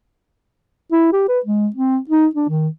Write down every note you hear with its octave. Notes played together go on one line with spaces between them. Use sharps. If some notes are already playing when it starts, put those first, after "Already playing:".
E4
G4
B4
G#3
C4
D#4
D4
D#3